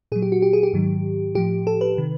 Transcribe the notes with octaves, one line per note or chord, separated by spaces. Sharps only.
A#2 F#3 G#4
G4
F#4
G4
G#4
G4
G#2 D#3 F#3
A2 F3 G4
A4
B4
C3 D#3